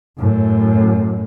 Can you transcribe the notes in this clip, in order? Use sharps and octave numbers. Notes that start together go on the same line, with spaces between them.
F#2 A2